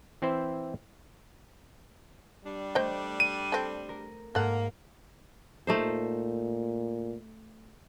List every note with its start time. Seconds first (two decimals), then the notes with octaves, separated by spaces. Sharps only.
0.22 E3 C4 E4 C5 E5
2.45 G3 D4
2.75 A3 C5 D#5 G5
3.20 D#7
3.52 C4 A4
3.89 A#4
4.35 G#2 A#3 A4 F#5
5.67 A#2 A3 D#4 C5